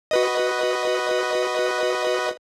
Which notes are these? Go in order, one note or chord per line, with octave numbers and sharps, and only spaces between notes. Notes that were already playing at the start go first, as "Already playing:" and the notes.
F#4 B4 D#5